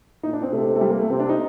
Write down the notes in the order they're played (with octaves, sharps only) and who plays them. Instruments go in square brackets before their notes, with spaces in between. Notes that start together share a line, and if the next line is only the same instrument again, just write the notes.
[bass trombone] A#2 [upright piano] D#4
[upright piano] D4
C4
[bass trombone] C3 [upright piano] A3
[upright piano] A3
G3
A#3
A3
[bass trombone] C3 [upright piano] C4
[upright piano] D4
D#4